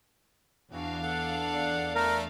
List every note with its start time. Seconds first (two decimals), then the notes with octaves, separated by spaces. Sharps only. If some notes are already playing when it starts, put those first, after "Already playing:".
0.72 E2 E3 D4 F#4 F5
1.02 A4 F#5
1.52 D5
1.95 A3 A#4